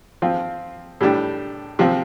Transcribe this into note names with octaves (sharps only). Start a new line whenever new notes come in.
F3 C4 F4
A2 G3 D4 G4
C3 F3 C4